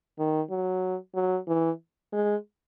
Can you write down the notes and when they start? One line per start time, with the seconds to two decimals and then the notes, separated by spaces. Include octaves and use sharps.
0.19 D#3
0.50 F#3
1.15 F#3
1.48 E3
2.13 G#3